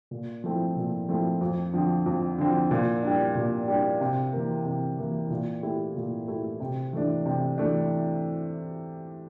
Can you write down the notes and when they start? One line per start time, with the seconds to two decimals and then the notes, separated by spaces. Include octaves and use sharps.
0.11 A#2
0.44 F3 A3 C4 E4
0.76 A#2
1.09 F3 A3 C4 E4
1.41 F2
1.74 D3 F3 C4
2.06 F2
2.38 D3 F3 C4
2.71 A#2
3.03 G3 D4
3.35 A#2
3.68 G3 D4
4.01 C3
4.33 E3 A#3
4.65 C3
4.99 E3 A#3
5.30 A#2
5.63 A3 E4 G4
5.96 A#2
6.28 A3 E4 G4
6.60 C3
6.93 E3 A3 D4
7.26 C3
7.58 E3 A3 D4